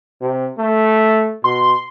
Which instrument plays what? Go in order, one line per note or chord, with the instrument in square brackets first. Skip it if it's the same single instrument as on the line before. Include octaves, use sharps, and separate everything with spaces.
[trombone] C3
A3
[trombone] B2 [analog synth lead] C6